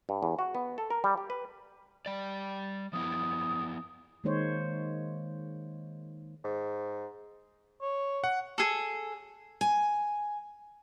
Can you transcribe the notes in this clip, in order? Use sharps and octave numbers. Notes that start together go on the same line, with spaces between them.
G2
E2
F#4
B3
A4
A#4
G3
G4
B4
G3 D5
F3 B3 E4 D#6
D#3 G#3 A#3 D#4 C5 C#5
G#2
C#5
F#5
G#4 A4
G#5